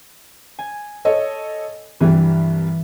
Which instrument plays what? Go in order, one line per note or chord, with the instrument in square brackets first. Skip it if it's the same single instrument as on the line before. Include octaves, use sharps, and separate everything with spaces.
[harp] G#5
[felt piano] A4 C#5 D#5
[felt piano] C2 G2 G3 [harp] E3